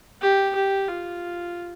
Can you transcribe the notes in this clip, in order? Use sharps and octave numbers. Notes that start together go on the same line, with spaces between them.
G4
G4
F4